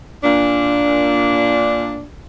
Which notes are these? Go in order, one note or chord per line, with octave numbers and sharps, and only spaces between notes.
A#2 D4